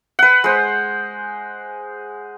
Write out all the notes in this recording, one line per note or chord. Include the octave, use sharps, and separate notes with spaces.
B4 F#5
G#3 C5